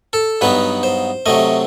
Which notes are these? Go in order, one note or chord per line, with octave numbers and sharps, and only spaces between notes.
A4
G2 F#3 B3 D#4 B4
C5
C3 F#3 A3 D#5